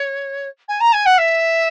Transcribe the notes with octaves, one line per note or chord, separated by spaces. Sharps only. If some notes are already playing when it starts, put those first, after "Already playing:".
Already playing: C#5
G#5
A#5
G#5
F#5
E5